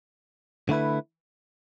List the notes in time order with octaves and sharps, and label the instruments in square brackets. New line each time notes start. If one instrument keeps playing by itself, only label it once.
[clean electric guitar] D3 A3 E4 B4